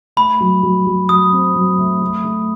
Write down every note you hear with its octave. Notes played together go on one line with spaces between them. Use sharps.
A3 B5
F#3
F#3
F#3
F#3 D#6
C4
F#3
A3
A3
A3